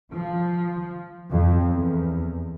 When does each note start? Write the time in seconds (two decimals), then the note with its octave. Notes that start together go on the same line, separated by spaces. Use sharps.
0.14 F3
1.30 F2
1.72 E2